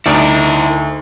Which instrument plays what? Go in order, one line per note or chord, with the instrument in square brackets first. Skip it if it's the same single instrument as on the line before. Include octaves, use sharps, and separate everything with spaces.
[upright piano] D2 [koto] D#4 D5 [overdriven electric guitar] E4 A#4